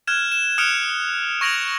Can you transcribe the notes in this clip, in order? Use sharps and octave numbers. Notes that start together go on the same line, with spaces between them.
F6 F#6 G#6 E7
E7
D#6 F6 F#6 C#7 D7 F7
C#6 G#6 A#6 D7 F7 F#7